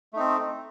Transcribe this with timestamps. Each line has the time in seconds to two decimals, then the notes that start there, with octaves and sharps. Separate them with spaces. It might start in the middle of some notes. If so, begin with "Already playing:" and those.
0.13 A3
0.16 D#4
0.19 C4